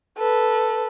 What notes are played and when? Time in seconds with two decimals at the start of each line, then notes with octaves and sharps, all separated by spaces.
0.18 A4 B4